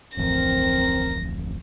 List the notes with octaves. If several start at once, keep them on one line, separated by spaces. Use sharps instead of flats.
D1 A1 F2 C4 A#4 A#6